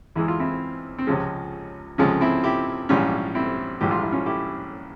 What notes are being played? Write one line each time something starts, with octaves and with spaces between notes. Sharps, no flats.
E2 E3 G#3 E4
F4
C4 E4
C4
C#2 C3 F3 G#3 C#4
C#2 C3 F3 G#3 C#4
C4 E4
E4 G4
A#1 G#2 E3 G3 C#4 F4
C4 E4
A#1 G#2 E3 G3 G4
F4
E4
C#4 F4
E4 G4